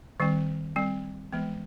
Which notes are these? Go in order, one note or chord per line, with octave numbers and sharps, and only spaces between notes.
D#3 G3 C4
G3 C4
E3 G#3 B3